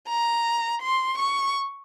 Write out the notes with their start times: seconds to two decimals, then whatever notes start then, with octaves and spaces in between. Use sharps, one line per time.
0.09 A#5
0.82 C6
1.18 C#6